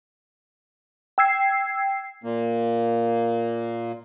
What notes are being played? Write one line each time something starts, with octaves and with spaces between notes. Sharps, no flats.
G5 E6 G#6 C7
A#2 A#3